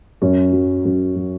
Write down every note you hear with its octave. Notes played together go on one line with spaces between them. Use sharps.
F#2 C#4
F#3
F#2
F#3